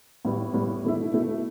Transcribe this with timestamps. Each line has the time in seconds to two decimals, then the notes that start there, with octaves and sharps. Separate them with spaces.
0.25 A2 G3 B3
0.53 A2 G3 B3
0.84 B2 A3 E4
1.14 B2 A3 E4